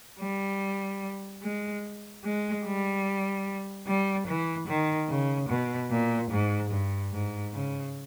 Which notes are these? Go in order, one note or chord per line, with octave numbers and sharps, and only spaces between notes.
G3
G#3
G#3
G3
G3
E3
D#3
C#3
B2
A#2
G#2
G2
G#2
C#3